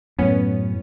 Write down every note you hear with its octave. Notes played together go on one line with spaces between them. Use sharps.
F#2 A2 B3 C#4